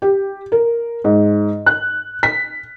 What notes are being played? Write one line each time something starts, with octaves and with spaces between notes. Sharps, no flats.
G4
A#4
G#2
F#6
B6